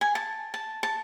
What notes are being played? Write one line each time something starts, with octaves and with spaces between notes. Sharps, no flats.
G#5
A5
A5
A5